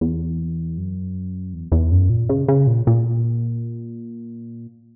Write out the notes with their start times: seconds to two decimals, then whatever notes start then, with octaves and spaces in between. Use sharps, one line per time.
0.01 E2
0.78 F#2
1.53 E2
1.72 E2
1.92 F#2
2.10 A#2
2.29 C#3
2.48 C#3
2.67 A#2
2.87 A#2